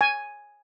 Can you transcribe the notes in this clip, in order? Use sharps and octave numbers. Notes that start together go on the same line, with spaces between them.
G#5